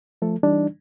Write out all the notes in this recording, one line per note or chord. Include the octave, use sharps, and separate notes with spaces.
F3 A3 A4
E3 G3 D4 D#4